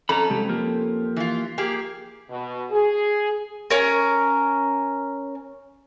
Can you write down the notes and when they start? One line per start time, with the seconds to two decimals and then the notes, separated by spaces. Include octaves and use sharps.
0.09 F2 C#4 A4 A#5 B5
0.30 C2 G#3 G4
0.49 F3 A#3 G4
1.16 E3 F4
1.58 A#3 G4 G#4
2.30 B2
2.71 G#4
3.70 C#4 A#4